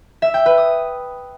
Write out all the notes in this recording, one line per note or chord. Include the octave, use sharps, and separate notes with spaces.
E5
G5
B4
D#6